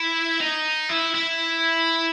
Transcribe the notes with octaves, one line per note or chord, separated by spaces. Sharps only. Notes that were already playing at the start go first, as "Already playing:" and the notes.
Already playing: E4
D#4
E4
E4